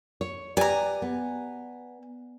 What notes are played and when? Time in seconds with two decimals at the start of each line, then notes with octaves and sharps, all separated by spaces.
0.21 C#5
0.57 G4 B4 D5 G#5 A#5
1.02 B3